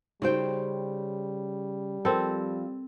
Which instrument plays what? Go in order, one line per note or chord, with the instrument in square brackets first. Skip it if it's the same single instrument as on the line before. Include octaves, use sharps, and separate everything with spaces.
[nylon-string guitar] C#3 C5 G5 [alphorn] G3 [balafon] D#4 F#4
[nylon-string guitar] F3 [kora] C4 A4 [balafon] A#4